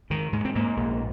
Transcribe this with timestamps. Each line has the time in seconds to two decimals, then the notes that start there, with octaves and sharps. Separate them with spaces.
0.10 G#2 D#3
0.33 G#2 G#3
0.45 C4
0.55 G#2 A#3
0.77 A#1 A#3